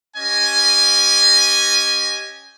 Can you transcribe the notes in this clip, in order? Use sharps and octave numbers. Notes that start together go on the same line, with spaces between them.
C#4 G4 D#5 G#5